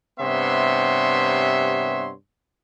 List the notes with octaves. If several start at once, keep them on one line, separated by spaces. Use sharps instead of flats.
G2 C3 B3 C#5 E5 C6